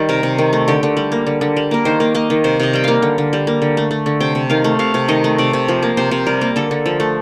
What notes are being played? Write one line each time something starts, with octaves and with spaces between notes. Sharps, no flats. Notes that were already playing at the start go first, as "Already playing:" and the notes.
Already playing: D#3 G3
C3 A#4
C3
D#3
A3
D3 G4
D3
G3
A#3
D3
D3
G3
A#3 A#4
D#3 C5
A#3
A#3 D#5
D#3
C3 C5
C3 D#5
G3 G5
A#3 F5
D3
D3
G3
A#3
D3
A3
A3
D3
C3 G5
C3
D#3 F5
A3
C3 F5
C3
D#3 D#5
A3
C3 D5
C3
F3
A#3
C3 C5
C3
G3 A#4
A#3
D3 A4
D3
F3
A3